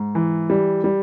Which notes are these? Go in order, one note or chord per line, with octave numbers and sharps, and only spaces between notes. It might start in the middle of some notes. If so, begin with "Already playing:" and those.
Already playing: G#2
E3
G3
G3